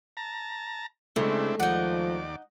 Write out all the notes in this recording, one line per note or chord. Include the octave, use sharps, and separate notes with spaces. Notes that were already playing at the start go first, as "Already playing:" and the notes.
A5 A#5
C#3 G#3 A3 C4 D4 E4
D#2 F3 D#4 D5 F#5